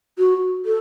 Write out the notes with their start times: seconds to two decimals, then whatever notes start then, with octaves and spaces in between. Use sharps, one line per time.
0.18 F#4
0.66 A4